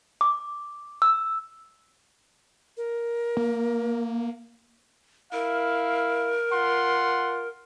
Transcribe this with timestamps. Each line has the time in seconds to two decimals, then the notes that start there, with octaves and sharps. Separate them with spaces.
0.21 D6
1.02 E6
2.77 A#4
3.37 A#3
5.33 E4 A#4 F5
6.53 F4 F#5 C6